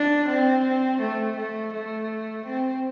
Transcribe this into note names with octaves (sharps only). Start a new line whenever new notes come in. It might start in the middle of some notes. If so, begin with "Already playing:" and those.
Already playing: D4
C4
A3
A3
A3
C4